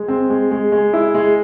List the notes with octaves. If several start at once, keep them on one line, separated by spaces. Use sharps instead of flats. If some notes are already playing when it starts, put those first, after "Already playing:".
Already playing: G#3
C4
G#3
G#3
G#3
E4
G#3